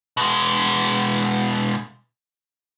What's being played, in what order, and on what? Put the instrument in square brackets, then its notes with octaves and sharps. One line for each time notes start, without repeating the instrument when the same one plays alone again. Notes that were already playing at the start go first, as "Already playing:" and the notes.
[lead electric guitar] B2 G#3